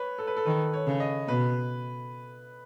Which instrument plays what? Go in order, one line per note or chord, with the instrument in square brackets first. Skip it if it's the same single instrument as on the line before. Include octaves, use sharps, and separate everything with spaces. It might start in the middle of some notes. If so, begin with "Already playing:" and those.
Already playing: [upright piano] B4 C#5
A4
B4
A4
[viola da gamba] D#3 [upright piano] B4
[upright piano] C#5
[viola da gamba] C#3
[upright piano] D#5
[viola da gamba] B2 [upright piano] B4